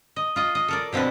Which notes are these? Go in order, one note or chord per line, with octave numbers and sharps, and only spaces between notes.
D#5
F4 D#5
D#5
A4 A#4 D5
B2 F3 C4 D4 B4